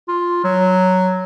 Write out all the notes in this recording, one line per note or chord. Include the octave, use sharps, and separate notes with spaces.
F4
F#3